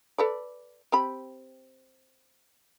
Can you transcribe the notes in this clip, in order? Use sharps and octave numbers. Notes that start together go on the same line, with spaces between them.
A4 B4 D5
C4 G4 B5